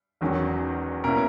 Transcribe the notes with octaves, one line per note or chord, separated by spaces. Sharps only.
E1 E2 D#3 F#3 C#4
B2 A#3 C#4 E4 A#4